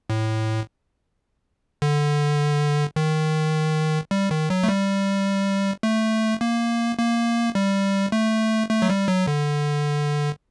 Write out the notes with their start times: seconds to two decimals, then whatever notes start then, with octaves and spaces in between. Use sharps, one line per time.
0.10 A2
1.82 D3
2.96 D#3
4.11 G3
4.31 D#3
4.50 F#3
4.63 A3
4.69 G3
5.83 A3
6.41 A#3
6.98 A#3
7.55 G3
8.12 A3
8.70 A3
8.82 F#3
8.90 G3
9.08 F#3
9.27 D3